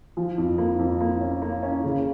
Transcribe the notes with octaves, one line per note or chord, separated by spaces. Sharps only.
F3
F2
A#3
F2
A#3
C#4
A#3
C#4
C#3